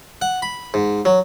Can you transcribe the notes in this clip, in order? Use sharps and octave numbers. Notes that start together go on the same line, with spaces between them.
F#5
B5
G#2
F#3